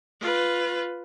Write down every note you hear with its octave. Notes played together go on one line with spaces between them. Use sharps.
F4 B4